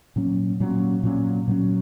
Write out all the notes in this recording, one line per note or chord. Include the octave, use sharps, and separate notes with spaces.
A#2 F#3 C#4
A#2 F#3 C#4
A#2 F#3 C#4
A#2 F#3 C#4